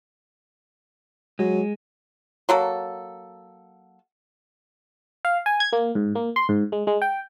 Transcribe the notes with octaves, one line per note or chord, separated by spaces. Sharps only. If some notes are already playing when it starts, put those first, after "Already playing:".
F#3 G#3
F#3 A#3 A4
F5
G#5
G#6
A#3
G#2
A#3
C6
G#2
G#3
G#3
G5